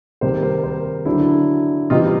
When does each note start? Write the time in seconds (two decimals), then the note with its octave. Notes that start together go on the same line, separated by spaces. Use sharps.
0.21 C3 D#3 G3 A#4 C5
0.43 A#4 C5
0.64 A#4 C5
1.05 D3 F#3 D4 E4
1.90 C3 E3 G3 D#4 F4